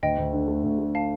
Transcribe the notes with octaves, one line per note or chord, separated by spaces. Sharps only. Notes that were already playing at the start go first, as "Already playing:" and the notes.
D2 D#5 G5
D2
D3
A3
D2
A3
F5 A5